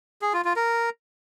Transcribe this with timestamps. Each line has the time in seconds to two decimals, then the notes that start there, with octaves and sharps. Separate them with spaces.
0.22 G#4
0.33 F4
0.45 F4
0.56 A#4